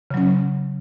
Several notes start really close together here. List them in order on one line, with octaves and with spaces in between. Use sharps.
C#3 F#3 C#4